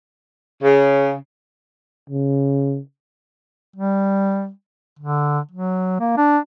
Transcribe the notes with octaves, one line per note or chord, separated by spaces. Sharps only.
C#3
C#3
G3
D3
F#3
A#3
D4